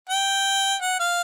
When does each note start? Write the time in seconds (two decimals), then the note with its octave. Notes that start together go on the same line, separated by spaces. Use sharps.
0.09 G5
0.82 F#5
1.00 F5